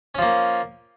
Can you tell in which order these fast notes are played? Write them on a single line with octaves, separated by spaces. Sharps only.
C#4 F3 A#3